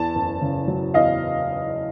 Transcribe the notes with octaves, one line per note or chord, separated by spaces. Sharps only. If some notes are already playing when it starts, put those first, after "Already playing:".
Already playing: E2 A5
F#1
C#3
F#3
E2 D#5 F5